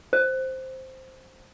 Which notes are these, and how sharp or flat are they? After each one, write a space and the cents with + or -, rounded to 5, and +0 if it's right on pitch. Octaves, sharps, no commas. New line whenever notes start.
C5 +0